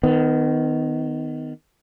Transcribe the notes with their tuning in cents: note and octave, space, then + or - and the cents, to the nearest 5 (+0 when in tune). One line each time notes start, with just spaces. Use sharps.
D#3 +0 B3 +35